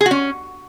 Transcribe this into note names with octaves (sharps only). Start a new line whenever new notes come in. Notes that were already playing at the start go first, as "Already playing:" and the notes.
G#4
F#4
C#4